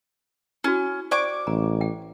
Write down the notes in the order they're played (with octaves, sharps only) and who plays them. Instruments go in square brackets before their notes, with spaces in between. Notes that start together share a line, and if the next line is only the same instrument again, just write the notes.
[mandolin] C#4 [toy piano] E4 F#4
[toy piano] C5 D5 G5 [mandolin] C#6 D6
[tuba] A1 [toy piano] A#5
[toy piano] G5